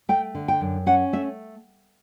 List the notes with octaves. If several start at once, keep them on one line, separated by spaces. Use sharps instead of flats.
A3 G5
D3
G5
F#2
C#4 F#5
A3 E5